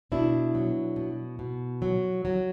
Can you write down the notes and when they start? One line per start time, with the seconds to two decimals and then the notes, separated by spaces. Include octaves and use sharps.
0.12 B2 D4 E4
0.55 F#3
0.96 B2
1.39 B2
1.82 F#3
2.25 F#3